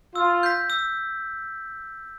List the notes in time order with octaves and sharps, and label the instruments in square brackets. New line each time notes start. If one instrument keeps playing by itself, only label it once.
[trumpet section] F4 [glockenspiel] E6
[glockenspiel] G6 B6
E6